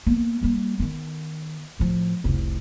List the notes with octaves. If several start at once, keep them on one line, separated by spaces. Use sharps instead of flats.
A#3 B3
G3 A#3
D#3 B3
A2 F3
F1 C2